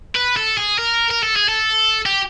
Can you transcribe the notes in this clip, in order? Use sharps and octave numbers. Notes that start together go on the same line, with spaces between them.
B4
A4
G#4
A#4
A#4
A4
G#4
A4
G4